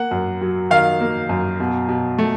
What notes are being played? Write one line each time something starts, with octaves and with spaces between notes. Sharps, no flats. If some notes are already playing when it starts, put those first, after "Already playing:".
Already playing: A#3 F#5
F#2
F#3
D#3 F5
A#3
F#2
B2
B2
A3